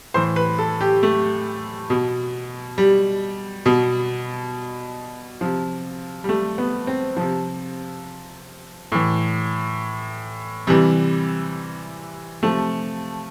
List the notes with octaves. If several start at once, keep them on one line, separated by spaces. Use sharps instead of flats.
A2 E3 C5
B4
A4
G4
A3
B2
G3
B2
C3 F3
G3
A3
B3
C4
C3 F3
A2 E3
C3 E3 G3
C3 F3 A3